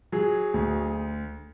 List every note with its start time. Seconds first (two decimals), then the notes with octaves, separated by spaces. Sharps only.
0.12 F#3 G#4
0.54 D2